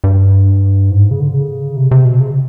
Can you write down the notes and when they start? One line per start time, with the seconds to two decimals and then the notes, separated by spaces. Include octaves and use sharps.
0.04 G2
0.90 G#2
1.11 C#3
1.20 D3
1.34 C#3
1.76 C3
1.91 C3
2.05 B2
2.20 C#3